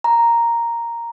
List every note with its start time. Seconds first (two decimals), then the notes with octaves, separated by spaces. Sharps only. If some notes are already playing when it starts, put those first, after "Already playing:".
0.04 A#5